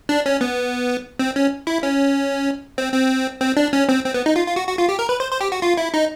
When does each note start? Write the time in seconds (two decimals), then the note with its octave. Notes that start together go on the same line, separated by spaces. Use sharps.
0.09 D4
0.26 C#4
0.41 B3
1.20 C4
1.36 C#4
1.67 E4
1.83 C#4
2.78 C4
2.94 C4
3.41 C4
3.57 D4
3.73 C#4
3.89 C4
4.04 C4
4.14 B3
4.26 D#4
4.36 F4
4.46 F4
4.56 F#4
4.67 F#4
4.78 F4
4.89 G4
4.99 A#4
5.09 B4
5.20 C5
5.31 C5
5.41 G4
5.52 F#4
5.62 F4
5.77 E4
5.94 D#4